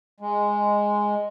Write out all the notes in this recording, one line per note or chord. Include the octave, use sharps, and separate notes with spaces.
G#3